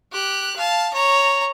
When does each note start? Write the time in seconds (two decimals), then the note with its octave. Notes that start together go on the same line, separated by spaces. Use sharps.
0.12 G4 F#6
0.56 F5 A5
0.93 C#5 A#5